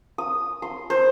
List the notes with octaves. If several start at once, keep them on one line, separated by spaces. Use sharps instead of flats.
D#6
C6
C5